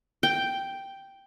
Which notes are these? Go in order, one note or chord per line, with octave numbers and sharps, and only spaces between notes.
G5